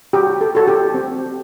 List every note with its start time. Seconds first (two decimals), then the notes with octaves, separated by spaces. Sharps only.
0.13 F#4 G4
0.41 A4
0.55 F#4 A4
0.67 G4
0.94 C4